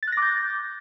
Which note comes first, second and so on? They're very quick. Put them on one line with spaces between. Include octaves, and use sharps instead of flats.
A6 F#6 A#6 D6 G6